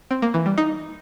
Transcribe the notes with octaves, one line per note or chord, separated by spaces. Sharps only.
C4
A#3
E3
G3
D#4